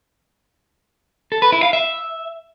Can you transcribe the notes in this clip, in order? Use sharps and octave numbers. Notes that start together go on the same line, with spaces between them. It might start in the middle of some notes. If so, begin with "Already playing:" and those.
A4
B4
E4
F5
E5